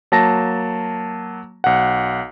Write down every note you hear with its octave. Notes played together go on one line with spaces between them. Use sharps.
F#3 A#3 A5 A#6
B1 F#5